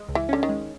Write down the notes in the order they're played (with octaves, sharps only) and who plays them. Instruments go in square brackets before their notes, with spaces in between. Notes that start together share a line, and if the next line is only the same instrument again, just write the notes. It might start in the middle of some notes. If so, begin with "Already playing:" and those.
Already playing: [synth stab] G#3
C#2
[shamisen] E3
[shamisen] D3 [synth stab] C#4
[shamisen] D#3
[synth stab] G#3